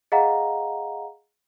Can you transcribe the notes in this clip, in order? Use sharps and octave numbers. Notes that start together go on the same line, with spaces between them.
G#4 D#5 F5 F#5 A#5